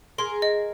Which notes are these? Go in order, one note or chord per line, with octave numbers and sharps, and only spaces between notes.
G#4 A#4 C6
D#5